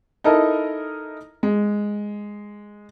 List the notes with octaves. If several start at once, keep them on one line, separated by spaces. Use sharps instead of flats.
D#4 E4 A4 A#4 D#5
G#3